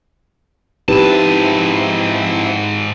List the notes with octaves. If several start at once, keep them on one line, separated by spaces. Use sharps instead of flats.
G#2 F3 C4 D#4 E4 G4 B4 A5